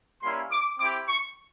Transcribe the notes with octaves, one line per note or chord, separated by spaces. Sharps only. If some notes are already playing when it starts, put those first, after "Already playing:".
G3 A#3 C#4 E4 C6
D6
C4 E4 G4 D6
C#6